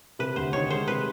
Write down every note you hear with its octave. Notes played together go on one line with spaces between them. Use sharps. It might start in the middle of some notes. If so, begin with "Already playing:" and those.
C3 B4
D2 C5
D#3 C#5
G#3 C5
C3 B4